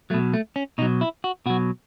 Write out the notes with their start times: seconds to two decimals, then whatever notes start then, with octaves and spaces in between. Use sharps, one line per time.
0.10 F#3 A3
0.14 B2
0.34 A3
0.56 C#4
0.78 B2 D#4
0.82 F#3
1.01 E4
1.24 F#4
1.46 B2 F#3 F#4